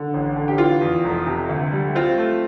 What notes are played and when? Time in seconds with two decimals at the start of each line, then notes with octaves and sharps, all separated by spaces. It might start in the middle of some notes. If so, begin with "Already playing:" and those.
Already playing: D3
0.14 A1
0.36 D3
0.48 G4
0.58 E3 F4
0.81 E2
1.04 F1
1.26 C3
1.49 D2
1.72 G3
1.95 C4 F4
2.18 A3